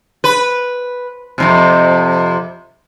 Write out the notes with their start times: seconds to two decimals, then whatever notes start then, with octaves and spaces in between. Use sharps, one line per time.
0.24 B4
1.38 F2 A2 C3